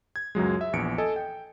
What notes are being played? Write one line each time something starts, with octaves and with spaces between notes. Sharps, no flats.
G#6
C#2 F#2 F#3 G#3
E5
A#1 E2 C#7 D7
A4 D#5 G#5
G5